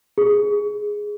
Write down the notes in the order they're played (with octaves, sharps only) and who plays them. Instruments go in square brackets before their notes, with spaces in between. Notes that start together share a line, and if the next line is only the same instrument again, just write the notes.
[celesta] G#4